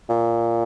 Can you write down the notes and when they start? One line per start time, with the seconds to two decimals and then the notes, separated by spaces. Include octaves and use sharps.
0.09 A#2